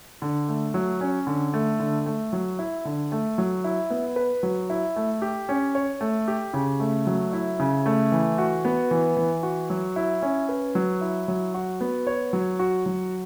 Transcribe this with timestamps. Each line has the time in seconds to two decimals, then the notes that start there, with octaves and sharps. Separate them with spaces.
0.22 D3
0.48 A3
0.74 F#3
1.01 C#4
1.27 D3
1.54 A3
1.80 D3
2.06 A3
2.33 F#3
2.59 E4
2.85 D3
3.12 A3
3.38 F#3
3.64 E4
3.90 B3
4.16 B4
4.43 F#3
4.70 E4
4.96 A3
5.22 G4
5.49 C#4
5.75 C#5
6.01 A3
6.28 G4
6.54 C#3
6.80 A3
7.07 F#3
7.33 E4
7.60 C#3
7.86 A3
8.12 E3
8.38 F#4
8.65 B3
8.91 E3
9.17 E3
9.43 F#4
9.70 F#3
9.96 E4
10.22 C#4
10.49 B4
10.75 F#3
11.01 E4
11.28 F#3
11.54 F#4
11.81 B3
12.07 C#5
12.33 F#3
12.59 F#4
12.86 F#3